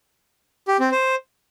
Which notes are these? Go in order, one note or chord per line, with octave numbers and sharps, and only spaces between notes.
G4
C4
C5